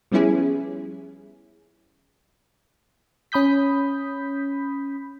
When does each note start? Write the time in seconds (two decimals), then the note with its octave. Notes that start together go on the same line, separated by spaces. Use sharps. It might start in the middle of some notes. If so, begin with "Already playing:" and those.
0.11 F3 G3 B3 C#4 E4 G#4
3.32 C#4 B5 D#6 G6 B6